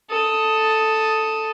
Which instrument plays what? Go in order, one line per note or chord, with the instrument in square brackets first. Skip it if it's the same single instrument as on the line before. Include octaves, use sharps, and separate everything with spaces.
[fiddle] A4 D#6